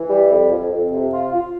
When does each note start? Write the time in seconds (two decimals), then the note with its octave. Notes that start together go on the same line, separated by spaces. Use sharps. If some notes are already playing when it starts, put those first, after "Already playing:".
Already playing: E3
0.10 G3
0.30 F2
0.50 F2
0.71 F2
0.91 C3
1.12 F4
1.32 F4